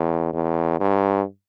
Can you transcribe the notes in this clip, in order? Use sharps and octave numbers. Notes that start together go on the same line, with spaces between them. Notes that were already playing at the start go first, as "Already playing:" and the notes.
Already playing: E2
E2
G2